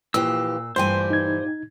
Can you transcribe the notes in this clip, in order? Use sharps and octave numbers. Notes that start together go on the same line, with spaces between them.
A#2 E3 F3 G4 E6
G2 A#2 E3 A3 G4 C5 G#5 C6
D#4 G#6